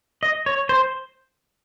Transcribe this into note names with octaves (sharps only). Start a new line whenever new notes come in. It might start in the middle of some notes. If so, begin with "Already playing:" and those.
D#5
C#5
C5